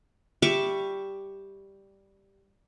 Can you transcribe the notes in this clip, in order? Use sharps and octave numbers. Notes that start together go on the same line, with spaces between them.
G3 E5 C#6 D6